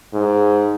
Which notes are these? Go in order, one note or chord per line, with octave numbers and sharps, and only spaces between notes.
G#2